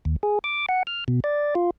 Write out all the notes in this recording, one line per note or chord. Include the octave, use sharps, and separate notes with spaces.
D#2
G#4
D6
F#5
F6
B2
D5
F4